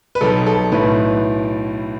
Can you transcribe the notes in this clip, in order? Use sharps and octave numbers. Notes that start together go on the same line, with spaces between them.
B4
B1 B2 A4
A4
B1 A2 E3 B4